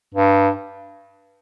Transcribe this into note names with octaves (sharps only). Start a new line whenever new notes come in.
G2